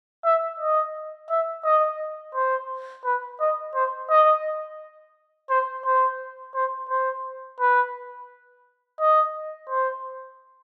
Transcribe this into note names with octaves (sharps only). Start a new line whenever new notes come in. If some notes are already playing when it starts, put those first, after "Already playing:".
E5
D#5
E5
D#5
C5
B4
D#5
C5
D#5
C5
C5
C5
C5
B4
D#5
C5